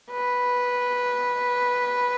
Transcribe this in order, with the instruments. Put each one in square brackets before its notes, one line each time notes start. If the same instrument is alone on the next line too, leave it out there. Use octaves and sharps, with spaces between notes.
[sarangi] B4